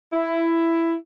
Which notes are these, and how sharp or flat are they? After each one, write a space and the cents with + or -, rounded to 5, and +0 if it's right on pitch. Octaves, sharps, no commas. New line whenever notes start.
E4 +10